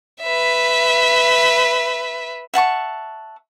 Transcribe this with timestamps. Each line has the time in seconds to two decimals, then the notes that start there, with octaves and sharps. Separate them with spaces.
0.22 B4 E5
2.54 E5 F#5 A5 C#6